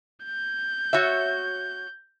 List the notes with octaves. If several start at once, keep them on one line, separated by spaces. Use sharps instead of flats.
G6
F#4 C#5 E5